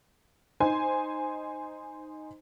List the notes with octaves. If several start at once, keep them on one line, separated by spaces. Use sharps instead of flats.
D#4 C5 G#5